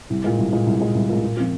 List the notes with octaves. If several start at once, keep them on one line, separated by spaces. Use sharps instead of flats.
C2
A#2 G#3
C2
A#2 G#3
C2
A#2 G#3
C2
A#2 G#3
A#2
F3 C4 F4